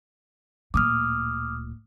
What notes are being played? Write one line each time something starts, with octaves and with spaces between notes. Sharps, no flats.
D1 A#2 D6 D#6 F6